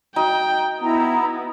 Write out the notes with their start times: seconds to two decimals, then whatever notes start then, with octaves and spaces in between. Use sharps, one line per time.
0.16 D#4 F#4 G5
0.81 B3 E4 A#5